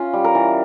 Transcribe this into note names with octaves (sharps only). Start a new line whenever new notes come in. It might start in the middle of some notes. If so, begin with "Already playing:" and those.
Already playing: C#4 F4
G3
A#4
E3